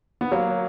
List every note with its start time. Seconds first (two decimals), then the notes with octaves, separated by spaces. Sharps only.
0.21 B3
0.31 F#3 A#3